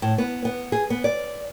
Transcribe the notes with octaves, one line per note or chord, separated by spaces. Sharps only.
A2
B3
B3
G#4
B3
D5